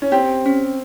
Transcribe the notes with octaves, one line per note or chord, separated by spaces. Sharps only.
C#4
C4 G4
C#4